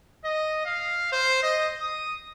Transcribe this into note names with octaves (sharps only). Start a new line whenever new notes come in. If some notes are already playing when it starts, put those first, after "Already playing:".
D#5
F5
C5
D#5
D#6